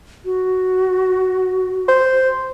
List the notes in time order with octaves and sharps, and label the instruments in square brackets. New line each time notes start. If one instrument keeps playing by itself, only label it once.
[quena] F#4
[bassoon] C5